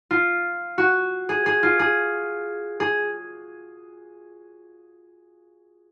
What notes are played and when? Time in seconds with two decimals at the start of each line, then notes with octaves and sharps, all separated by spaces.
0.11 F4
0.78 F#4
1.29 G#4
1.46 G#4
1.63 F4
1.79 G#4
2.80 G#4